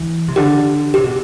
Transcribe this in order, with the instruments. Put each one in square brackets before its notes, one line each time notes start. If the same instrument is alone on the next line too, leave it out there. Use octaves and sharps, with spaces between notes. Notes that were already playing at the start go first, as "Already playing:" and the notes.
Already playing: [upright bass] E3
C3
[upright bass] D3 [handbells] G4
[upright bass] C3 [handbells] G4
[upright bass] B2